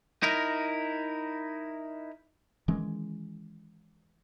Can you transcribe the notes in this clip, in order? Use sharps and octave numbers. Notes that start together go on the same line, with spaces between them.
D#4 E4 A#4
D#3 E3 G#3 C#4